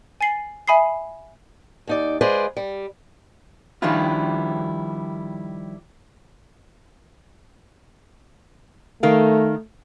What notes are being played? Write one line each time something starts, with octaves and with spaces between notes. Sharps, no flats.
G#5 A6 C7 F#7
E5 G#5 B5 D#6 C7
D#2 D#4 D5
G#3 F4 G#4 B4 C5 D5
G3
D#3 F3 G3 D4 E4 F4
D#3 A3 A#4 F5